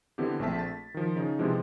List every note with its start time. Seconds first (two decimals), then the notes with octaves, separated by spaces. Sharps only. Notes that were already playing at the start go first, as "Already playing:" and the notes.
0.18 D3 E3 B3 C4 G4
0.39 A#1 A3 C4 E5 A5 B6
0.59 A6
0.94 D#3 F3
1.16 C#3 D#4
1.39 C3 E3 F3 G#3